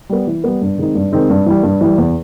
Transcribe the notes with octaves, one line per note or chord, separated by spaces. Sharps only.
G3 B3
E3
G3 B3
G2
D#3 G#3 C4 D#4
G2
D#3 G#3 C4 D#4
G2
E3 G3
G2
E3 G3
E2